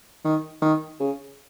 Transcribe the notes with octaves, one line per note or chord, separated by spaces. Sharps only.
D#3
D#3
C#3